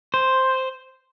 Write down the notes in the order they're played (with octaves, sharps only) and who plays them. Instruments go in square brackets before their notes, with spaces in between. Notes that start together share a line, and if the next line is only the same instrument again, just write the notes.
[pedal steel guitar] C5